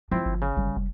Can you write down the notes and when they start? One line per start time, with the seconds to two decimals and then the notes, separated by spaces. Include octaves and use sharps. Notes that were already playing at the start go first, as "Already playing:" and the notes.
0.11 F3 C4 E4 F4
0.26 G1
0.42 C#3
0.57 G1 G3
0.77 F1